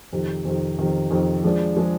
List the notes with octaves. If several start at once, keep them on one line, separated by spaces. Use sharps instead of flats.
F2 C3 D#3
F2 C3 D#3
F2 C3 D#3
F2 C3 D#3
F3 G#3 D4 G#4
F3 G#3 D4 G#4